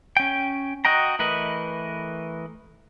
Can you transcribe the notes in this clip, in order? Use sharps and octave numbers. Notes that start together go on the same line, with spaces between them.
C#4 G5
F#4 D#5 G5 A#5
E3 A3 A#4 B4 D#5